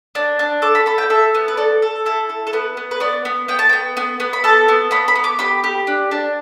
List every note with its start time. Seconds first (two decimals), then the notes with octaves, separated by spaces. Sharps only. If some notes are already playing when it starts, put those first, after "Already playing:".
0.15 D4
0.39 D4
0.62 A4 D6
0.75 B5
0.86 A4 B5
0.98 G5
1.10 A4 E5
1.35 B3
1.48 B4
1.57 A4 D5
1.82 A4
2.06 E4 A4
2.29 A4
2.47 A4
2.53 B3 B4
2.77 B3
2.91 B4
3.00 B3 D5
3.25 B3
3.48 B3 G5
3.59 A5
3.69 B3 G5
3.97 B3
4.20 B3
4.33 B5
4.44 A4 A5
4.68 B3
4.91 B3 B5
5.08 B5
5.15 B3
5.24 D6
5.39 G4 B5
5.64 G4
5.87 D4
6.11 D4